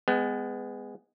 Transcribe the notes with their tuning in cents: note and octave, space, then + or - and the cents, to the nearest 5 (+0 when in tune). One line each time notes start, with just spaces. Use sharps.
G#3 -10 B3 +25